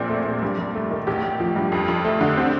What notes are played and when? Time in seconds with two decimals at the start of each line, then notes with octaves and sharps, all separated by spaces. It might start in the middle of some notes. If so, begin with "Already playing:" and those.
Already playing: A#1 A#2 C4
0.09 A3
0.26 A#2
0.42 G2
0.58 G2
0.74 A3
0.91 D#3
1.07 A1 G4
1.23 A1
1.40 F3
1.56 G2
1.72 F2
1.88 F2
2.05 A3
2.21 D3
2.37 C4